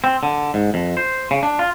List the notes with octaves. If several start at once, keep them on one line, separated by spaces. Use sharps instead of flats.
C4
D3
G#2
F2
C5
C#3
D4
F4